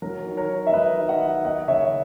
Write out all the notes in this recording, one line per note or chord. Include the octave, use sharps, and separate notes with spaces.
F#3 A#4
D#3
A#4 C#5
D#3
E5
F#3 B4 D#5
D#3
D#5 F#5
D#3
A#3 D#5 F#5
C#3 C#5 E5